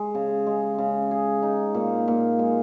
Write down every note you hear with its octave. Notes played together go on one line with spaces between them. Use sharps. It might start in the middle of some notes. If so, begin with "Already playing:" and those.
Already playing: G#3
C#3
G#3
C#3
G#4
D#4
A#2
A#2
G#3